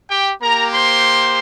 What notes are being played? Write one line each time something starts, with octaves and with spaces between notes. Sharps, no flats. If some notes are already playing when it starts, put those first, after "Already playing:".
G4 G5
A#3 G4 A#4 A#5
C5 C6